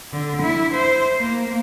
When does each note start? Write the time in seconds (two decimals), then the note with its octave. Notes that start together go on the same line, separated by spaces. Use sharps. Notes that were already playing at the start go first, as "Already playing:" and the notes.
0.12 D3
0.42 E4
0.73 C5
1.18 A#3